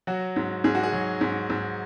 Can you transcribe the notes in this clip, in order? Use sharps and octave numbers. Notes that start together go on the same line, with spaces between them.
F#3 F#4
G#2
G#2 G#4
F#4
G#4
F#3
G#2
G#2